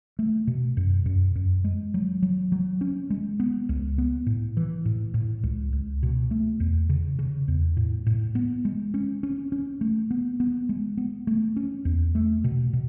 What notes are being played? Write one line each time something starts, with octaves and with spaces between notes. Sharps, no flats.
A3
B2
F#2
F#2
F#2
G#3
F#3
F#3
F#3
C#4
G#3
B3
C#2
B3
A2
E3
A2
A2
C#2
C#2
B2
A3
E2
C#3
C#3
E2
A2
A2
B3
G#3
C#4
C#4
C#4
A3
B3
B3
G#3
B3
A3
C#4
E2
A3
B2
B2